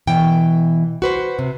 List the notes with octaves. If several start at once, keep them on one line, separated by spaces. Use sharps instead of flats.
B2 E3 G5
F#4 B4 C5
C3